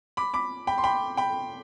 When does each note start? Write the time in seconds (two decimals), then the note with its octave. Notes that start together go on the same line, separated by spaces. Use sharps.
0.17 B5 D6
0.34 B5 D6
0.67 G5 B5
0.78 C6
0.84 G5 B5
1.17 G5 B5